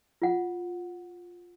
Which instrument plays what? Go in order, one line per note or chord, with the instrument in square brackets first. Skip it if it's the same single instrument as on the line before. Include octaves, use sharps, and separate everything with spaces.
[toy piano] F4 F#5